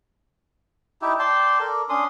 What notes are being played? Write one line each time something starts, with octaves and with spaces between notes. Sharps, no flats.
D#4 E4 G4 E5
D5 G5 A5 C6
A4 A#4 D5
C#4 D4 C6 D#6